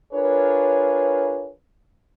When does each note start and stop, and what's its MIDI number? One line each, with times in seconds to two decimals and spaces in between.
0.13 1.50 62
0.13 1.50 65
0.13 1.50 68
0.13 1.50 70
0.13 1.50 71
0.13 1.50 73